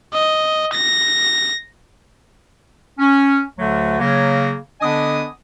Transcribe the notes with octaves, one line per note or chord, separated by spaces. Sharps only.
D#5
A#6
C#4
D2 D3 F#3 A3
C#3 F#3 A#3
D3 B3 D4 D#5 G#5 D#6